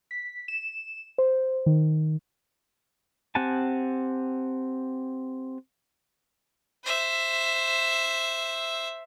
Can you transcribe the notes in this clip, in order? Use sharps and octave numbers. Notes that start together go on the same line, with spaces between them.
B6
E7
C5
D#3
C4 G4 F#5 G#5 A5
C5 E5